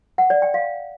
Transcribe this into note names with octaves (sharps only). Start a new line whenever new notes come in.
F#5
D5
G5
F5